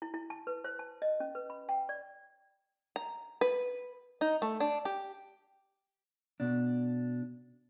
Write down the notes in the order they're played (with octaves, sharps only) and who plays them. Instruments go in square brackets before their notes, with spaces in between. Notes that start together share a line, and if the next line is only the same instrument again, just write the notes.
[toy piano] E4
E4
A5
B4
C5
A5
D#5
C#4
B4
B5
G5
D5
[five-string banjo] A#5
B4
D#4
A3
D4
G4
[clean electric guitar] B2 D4